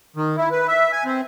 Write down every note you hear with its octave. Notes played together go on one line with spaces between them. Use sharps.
D#3
E4
B4
E5
G#5
C4